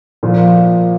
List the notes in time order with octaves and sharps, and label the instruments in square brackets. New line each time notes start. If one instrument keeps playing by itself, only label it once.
[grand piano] A#2 F3 A#3